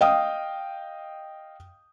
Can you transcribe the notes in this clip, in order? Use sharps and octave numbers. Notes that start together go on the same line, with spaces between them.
D#5 F5 G5 D#6